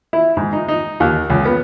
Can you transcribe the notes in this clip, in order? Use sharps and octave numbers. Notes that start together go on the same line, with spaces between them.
E4
G#2
D#4
D#4
D#2
C#2
B3